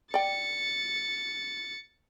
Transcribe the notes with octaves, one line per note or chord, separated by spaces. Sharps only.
D5 G5 A6 C#7